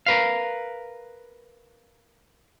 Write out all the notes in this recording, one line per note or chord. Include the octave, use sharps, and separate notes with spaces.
A#4 B4 F5